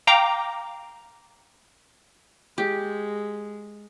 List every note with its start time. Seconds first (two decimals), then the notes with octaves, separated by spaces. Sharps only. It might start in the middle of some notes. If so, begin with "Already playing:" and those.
0.07 F5 G5 A#5 D6
2.58 G#3 G4